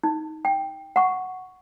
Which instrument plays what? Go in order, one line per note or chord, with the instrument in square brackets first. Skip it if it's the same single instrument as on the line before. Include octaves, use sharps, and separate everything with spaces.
[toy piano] D#4
G5
F#5 C#6